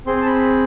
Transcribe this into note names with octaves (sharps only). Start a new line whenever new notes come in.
C4 G#4 C6
C6
A5
B5